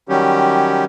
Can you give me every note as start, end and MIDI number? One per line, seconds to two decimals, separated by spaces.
0.09 0.85 51
0.09 0.85 54
0.09 0.85 55
0.09 0.85 61
0.09 0.85 67